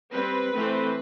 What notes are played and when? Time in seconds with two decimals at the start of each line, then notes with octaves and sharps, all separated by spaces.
0.13 G3 C4 B4
0.53 E3 A3 C4